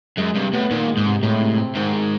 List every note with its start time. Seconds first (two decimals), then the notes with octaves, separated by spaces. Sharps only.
0.18 F#2 G#3
0.35 G2 C3
0.53 A2 B3
0.70 A#2 D#3
0.88 G#3
0.97 G#2
1.06 C3
1.23 A2 G#3
1.41 C3
1.58 C4
1.75 G#2 D#3
1.93 G#3